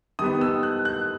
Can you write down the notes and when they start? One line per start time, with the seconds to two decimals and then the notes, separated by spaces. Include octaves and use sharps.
0.19 D#3 G3 B3 D#6
0.41 E6
0.63 F#6
0.85 F#6